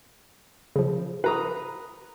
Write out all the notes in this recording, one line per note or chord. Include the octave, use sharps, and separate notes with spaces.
C#3 F3
B4 A#5 D#6